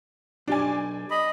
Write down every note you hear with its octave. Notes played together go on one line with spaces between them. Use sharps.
B1 D4 G4 D5 G#5
D#5 B5